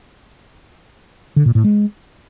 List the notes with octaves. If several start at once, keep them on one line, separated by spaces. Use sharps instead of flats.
D3
A#2
A2
G#3